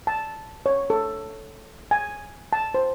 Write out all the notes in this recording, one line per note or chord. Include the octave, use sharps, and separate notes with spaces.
A5
C#5
A4
G#5
A5
C5